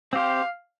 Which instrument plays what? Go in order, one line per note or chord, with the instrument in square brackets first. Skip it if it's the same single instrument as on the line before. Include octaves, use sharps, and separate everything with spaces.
[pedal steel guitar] C4 G4 C5 [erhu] F5